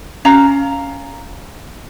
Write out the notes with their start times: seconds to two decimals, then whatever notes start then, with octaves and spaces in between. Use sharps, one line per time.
0.25 C#4 F5 A#5